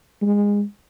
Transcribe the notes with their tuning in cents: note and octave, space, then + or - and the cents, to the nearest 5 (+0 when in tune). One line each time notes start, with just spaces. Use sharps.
G#3 -20